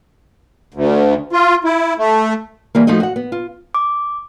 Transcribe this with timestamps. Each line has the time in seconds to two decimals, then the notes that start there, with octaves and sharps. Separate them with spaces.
0.74 D2
1.33 F4
1.64 E4
1.98 A3
2.75 E3 G3 A#3
2.87 F3 A3 D#4 F#4 D#5
3.00 F#4 F#5
3.16 B3
3.32 F4
3.75 D6